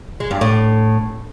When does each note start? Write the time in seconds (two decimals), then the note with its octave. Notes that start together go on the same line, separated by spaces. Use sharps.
0.20 G#3
0.31 G2
0.41 A2